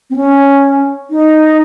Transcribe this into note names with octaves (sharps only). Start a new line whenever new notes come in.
C4
C#4
D#4